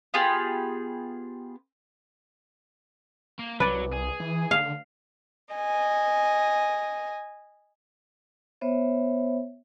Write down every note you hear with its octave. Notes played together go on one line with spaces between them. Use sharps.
B3 F4 G4 G#4
A#3
C2 F#3 B4 D5
G#4
E3
D3 F5
D#5 G#5
B3 C5 C#5 E5